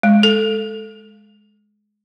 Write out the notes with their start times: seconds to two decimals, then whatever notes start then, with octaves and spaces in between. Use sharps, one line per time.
0.03 G#3
0.23 A4